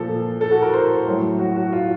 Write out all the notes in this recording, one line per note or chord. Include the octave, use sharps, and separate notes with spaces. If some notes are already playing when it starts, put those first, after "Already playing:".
Already playing: A#2 F3 A4
A4
F#4
A#4
C5
A2 F#3
F#4
F#4
F4